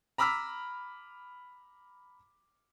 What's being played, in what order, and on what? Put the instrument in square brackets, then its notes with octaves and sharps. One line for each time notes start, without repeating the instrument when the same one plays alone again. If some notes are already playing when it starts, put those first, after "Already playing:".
[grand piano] A#5 B5 D6 E6 F6 B6